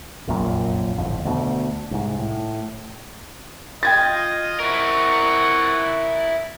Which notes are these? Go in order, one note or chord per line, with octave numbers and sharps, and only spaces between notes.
F1 A#1 F#2 A#2
D1 G#1 F2
D2 B2
C2 G#2
A2
F4 D#5 G5 G#6 A6
C4 E4 A#4 F#5 C#6